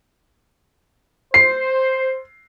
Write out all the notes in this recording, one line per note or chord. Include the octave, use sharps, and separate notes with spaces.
C5 C7